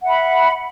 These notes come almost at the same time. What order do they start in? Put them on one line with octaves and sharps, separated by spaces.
F#5 E5 B5